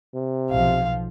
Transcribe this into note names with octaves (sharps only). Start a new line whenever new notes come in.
C3
B1 F3 F5